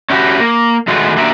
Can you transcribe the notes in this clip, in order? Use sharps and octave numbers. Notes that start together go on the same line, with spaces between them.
C#4 D#4 E4 F#4 G4
A#3
D#3 G#3 A3 B3 F4 F#4
A#3 D4 F#4 G4 A#4 E5